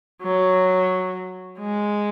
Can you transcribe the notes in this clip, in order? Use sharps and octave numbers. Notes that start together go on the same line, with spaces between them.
F#3
G#3